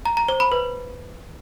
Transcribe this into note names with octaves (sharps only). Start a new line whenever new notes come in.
A#5
A#5
C5
B5
B4